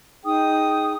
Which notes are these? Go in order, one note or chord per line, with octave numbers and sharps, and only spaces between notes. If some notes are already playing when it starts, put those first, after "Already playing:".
D#4 G#4 G5 D#6